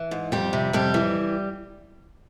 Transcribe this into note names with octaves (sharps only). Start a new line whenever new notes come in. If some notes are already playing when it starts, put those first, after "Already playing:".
Already playing: E3
G#2
F2 G3 G4
C3
F2 G3 G4
E3